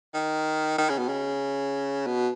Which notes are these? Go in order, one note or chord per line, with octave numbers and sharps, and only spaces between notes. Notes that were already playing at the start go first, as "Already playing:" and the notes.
D#3
D#3
C#3
B2
C#3
B2